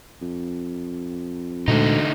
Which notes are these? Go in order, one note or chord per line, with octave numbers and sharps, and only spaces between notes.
F2
D2 A#2 D3 G#3 A3 D#4